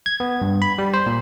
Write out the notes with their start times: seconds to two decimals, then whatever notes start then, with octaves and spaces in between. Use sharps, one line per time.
0.06 G#6
0.20 B3
0.42 G2
0.62 B5
0.78 G3
0.94 C5
1.07 A#2